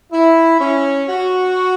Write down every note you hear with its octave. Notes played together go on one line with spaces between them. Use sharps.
E4
C#4
F#4